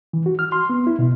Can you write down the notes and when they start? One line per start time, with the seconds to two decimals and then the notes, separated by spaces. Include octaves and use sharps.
0.13 E3
0.26 F#4
0.39 F6
0.52 C6
0.70 B3
0.87 E4
0.99 B2